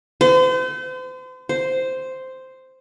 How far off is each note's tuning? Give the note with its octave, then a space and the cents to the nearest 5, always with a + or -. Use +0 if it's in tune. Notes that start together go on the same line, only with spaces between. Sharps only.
C5 -40
C5 -5